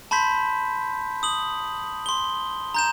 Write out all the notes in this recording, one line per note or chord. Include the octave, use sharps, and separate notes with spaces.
A5 B5 C6 G6 B6
D#6 F#7
C6 G7
A#5 G6 E7